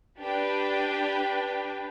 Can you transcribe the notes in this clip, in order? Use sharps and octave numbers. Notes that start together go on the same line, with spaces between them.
D4 G4 B4 G5